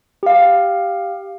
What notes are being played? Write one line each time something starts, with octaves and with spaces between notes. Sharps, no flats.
G4 F5